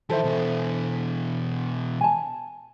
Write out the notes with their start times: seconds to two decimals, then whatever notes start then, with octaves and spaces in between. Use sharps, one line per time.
0.10 D#3 E3 A4 C5 E5
0.24 B2 E3
2.01 G#5 A5